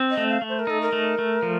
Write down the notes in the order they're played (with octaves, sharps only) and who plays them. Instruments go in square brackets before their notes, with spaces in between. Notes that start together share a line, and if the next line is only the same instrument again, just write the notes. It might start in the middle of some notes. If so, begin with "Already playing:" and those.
Already playing: [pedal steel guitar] C4
[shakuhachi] D#5
[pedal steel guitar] A3
[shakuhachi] F5
[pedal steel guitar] A3
[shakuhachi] C5
A#4
[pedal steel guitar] D#4 [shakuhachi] A4
[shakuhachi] A#4
[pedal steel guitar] A3
A3
F3